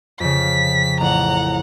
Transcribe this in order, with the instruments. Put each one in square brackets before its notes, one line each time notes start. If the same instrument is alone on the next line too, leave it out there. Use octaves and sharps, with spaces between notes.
[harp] F2 C#3 [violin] B6
[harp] A1 [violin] F#5 A#5